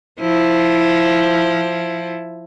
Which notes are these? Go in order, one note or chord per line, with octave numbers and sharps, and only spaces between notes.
F3 E4